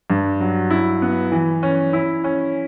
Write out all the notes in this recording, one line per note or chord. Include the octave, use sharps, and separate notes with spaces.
G2
F#3
E4
B3
E3
C#4
E4
C#4